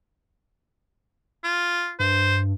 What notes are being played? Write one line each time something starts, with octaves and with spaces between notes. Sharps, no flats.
F4
G2 C5